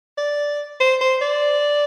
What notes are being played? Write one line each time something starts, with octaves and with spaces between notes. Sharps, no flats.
D5
C5
C5
D5